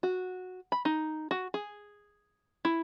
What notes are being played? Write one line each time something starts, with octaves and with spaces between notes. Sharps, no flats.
F#4
B5
D#4
F#4
G#4
E4